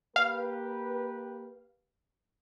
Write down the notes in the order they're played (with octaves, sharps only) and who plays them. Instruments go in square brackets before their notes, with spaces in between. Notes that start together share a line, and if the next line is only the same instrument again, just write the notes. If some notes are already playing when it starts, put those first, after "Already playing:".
[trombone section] A#3 G4 B4 [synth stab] F5